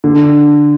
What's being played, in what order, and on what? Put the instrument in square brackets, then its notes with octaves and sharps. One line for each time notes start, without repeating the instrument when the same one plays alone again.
[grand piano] D3